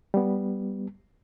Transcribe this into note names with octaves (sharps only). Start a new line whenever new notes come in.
G3 B3